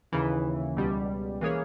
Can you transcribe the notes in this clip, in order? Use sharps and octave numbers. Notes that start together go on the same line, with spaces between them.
D#2 C#3 E3
C#2 B2 G3
E3 A#3 C#4 G#4 C#5